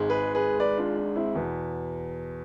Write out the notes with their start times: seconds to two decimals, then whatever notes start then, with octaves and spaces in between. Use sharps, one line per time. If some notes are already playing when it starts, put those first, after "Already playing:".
Already playing: G#1 G#2 G#3
0.10 G#4 B4
0.35 G#4 B4
0.59 B4 D5
0.78 D4 F4
0.97 D4
1.16 C4 E4
1.35 E2 B2 B3